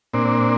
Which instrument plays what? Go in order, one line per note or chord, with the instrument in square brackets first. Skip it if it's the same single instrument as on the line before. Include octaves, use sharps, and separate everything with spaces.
[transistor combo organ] A#2 C4 D4